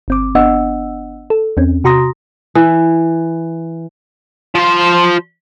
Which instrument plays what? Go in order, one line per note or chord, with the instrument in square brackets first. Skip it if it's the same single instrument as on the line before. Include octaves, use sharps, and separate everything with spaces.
[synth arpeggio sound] G1 C4 D6
G1 B3 D4 D#5 F#5 E6
A4
E2 C4 C#4
C3 F#4 A#5 C6 D#6 A#6
[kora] E3
[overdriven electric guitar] F3 C5